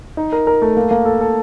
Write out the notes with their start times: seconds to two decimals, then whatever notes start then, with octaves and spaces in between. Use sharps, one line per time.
0.17 D#4
0.32 A#4
0.47 A#4
0.62 A3
0.77 A#3
0.91 A#3
1.05 A4
1.21 A4